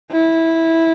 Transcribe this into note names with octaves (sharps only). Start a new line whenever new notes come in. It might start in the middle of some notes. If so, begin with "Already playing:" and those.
E4